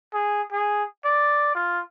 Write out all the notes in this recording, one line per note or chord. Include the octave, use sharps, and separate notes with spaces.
G#4
G#4
D5
F4